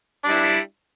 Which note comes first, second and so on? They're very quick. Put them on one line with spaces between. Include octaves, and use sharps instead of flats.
D4 G3 E4